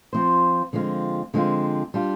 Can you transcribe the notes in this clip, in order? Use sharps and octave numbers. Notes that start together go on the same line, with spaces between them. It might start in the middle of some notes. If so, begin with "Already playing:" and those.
F3 C4 F4 C5
D3 F3 G#3 C4 F4
D3 F3 G#3 C4 F4
G3 D4 F4